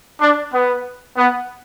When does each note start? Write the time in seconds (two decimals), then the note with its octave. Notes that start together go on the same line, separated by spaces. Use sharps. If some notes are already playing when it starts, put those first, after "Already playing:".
0.21 D4
0.53 B3
1.17 B3